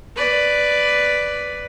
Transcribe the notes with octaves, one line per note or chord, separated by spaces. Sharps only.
B4 D5